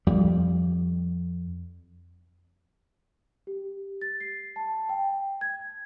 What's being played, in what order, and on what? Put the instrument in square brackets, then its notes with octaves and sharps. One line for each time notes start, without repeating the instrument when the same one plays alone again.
[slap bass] F2 G3
[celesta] G4
A6
C7
A5
G5
G#6